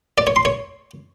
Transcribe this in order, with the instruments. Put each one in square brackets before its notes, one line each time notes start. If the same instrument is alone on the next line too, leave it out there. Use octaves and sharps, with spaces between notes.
[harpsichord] D5
C#5
C6
C#5